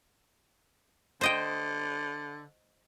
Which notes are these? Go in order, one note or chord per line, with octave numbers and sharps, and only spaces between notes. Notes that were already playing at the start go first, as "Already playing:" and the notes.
D3 C5 D#5 G5